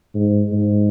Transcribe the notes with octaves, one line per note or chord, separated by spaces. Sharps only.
G#2
G#2